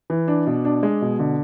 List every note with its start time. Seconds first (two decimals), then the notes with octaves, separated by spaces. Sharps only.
0.10 E3
0.28 D4
0.47 B2
0.65 D4
0.83 G#3
1.02 B2
1.19 D3